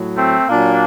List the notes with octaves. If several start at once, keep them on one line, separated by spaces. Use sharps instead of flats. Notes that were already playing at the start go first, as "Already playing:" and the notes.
Already playing: A2 F#3
A3 C4
A#2 F#3 A#3 D4